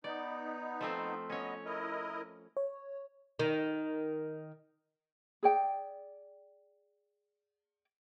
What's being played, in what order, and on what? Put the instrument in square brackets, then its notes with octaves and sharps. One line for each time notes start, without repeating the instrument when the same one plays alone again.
[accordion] B3 D#4 [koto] D5
[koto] F3 A3 C4
[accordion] F#3 B3 D#5 [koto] C#4 C#5
[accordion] E4 A#4 D#5
[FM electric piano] C#5
[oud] D#3
[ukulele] G#4 D5 G5